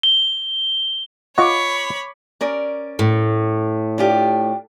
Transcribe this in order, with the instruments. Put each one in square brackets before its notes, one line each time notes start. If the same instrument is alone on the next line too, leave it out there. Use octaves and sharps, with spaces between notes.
[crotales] G7
[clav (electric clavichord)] F4 D#5 F#5 [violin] C#5 B5 [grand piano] C#6 D6
[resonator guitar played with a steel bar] C#4 A#4 D5
[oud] A2
[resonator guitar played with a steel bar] D4 F4 G4